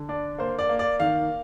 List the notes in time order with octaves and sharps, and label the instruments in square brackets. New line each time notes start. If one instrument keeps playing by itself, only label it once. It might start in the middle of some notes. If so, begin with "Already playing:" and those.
Already playing: [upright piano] D3
D4 D5
A#3 C5
D5
A#3
D5
D#3 F5